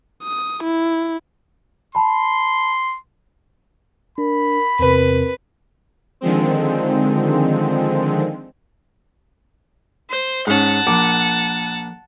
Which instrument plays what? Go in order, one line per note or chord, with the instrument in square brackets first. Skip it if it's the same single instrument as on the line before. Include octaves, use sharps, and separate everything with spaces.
[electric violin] D#6
E4
[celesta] A5 B5 [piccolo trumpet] C6
[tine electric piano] D4 [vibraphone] A#4 [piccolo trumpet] B5
[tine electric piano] E2 C3 [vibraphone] C4 A#4 [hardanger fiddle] B4
[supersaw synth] D3 D#3 F3 G#3 C4
[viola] C5
[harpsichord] G#2 C#4 [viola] F#5 A5
[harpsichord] A#1 D6